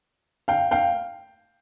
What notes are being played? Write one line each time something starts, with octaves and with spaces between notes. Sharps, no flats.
F5 G5
F5 G5